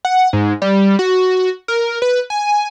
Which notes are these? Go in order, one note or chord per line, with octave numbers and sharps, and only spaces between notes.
F#5
G#2
G3
F#4
A#4
B4
G#5